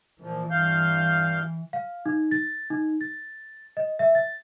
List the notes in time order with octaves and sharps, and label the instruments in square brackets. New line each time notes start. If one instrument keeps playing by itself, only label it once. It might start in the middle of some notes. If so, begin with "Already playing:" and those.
[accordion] A#2 F3 [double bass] E3
[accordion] G2 F5 G6
[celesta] F5
D#4
A6
D#4
A6
D#5
E5
A6